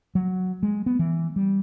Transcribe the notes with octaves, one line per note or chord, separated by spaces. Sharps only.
F#3
G#3
B3
E3
G3